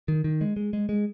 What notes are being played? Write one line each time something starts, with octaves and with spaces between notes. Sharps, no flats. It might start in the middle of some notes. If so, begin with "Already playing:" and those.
D#3
D#3
G#3
G#3
G#3
G#3